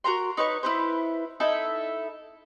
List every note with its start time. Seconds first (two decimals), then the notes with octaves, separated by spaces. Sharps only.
0.04 F#4 A#4 A#5 C6
0.37 D#4 B4 C#5 C#6
0.63 E4 B4 C5
1.40 D#4 E4 A4 E5